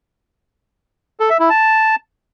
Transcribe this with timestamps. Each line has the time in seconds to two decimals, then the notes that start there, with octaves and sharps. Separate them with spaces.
1.20 A4
1.30 E5
1.40 E4
1.50 A5